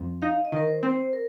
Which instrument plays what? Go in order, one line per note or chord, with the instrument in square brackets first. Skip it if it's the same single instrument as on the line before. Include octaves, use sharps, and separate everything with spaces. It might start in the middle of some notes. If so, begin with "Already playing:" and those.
Already playing: [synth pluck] F2
[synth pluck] D#4 [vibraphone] F5
[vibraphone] D#5
[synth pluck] D#3 [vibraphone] A#4
[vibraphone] C5
[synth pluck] C4
[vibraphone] C5
A#4